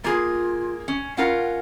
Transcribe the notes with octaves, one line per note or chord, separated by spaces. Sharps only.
A#3 F4 G#4
C#4
C#4 F4 A#4 F#5